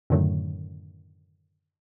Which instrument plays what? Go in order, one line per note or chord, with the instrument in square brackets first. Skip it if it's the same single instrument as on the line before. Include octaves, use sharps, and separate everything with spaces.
[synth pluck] F#2 A2 D3 D#3 F#3 A3